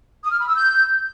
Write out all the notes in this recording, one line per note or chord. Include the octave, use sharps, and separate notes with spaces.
D#6
F6
B5
E6
G6